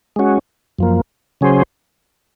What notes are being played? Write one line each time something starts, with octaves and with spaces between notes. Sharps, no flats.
G#3 C#4 F#4
F#2 F3 A#3
C#3 F#3 C#4 G#4 C5